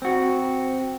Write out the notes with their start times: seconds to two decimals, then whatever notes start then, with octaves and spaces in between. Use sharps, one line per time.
0.02 C4 F#4